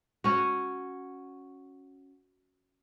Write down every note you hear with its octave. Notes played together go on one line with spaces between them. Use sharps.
C#4 F#4